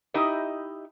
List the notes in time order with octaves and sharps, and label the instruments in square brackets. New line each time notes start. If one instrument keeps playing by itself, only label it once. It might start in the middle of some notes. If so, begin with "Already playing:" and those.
[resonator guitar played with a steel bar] D#4 E4 G4 D#5 E5